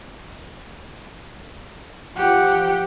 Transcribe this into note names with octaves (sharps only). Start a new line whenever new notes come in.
F3 G4 F#5